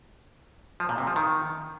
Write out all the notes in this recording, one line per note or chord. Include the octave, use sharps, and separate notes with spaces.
F3
A#2
C3
F3
D#3